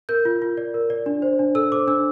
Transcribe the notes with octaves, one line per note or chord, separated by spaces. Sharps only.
A#4 G6
F4
F4
D5
A#4
D5
D4
C5
D4
A4 E6
C5 D6
D4 E6